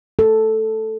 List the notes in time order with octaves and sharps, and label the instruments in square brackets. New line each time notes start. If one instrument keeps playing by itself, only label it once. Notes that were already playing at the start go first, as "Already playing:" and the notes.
[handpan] A4